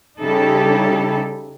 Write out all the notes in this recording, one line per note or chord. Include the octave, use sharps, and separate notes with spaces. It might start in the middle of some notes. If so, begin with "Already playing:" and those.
C#3 G3 D#4 E4 G4 A4